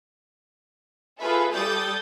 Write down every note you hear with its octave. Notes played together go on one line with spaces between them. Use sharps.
F4 G#4 A4 B4 E5
G3 A4 D5 D#6 G6 A6